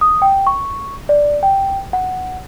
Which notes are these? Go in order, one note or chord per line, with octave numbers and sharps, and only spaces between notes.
D#6
G5
C#6
D5
G5
F#5